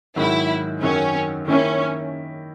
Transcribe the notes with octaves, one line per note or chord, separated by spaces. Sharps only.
G#2 D#3 F#3 E4
F#2 D#3 F#3 C#4
D#3 A#3 C#4 E4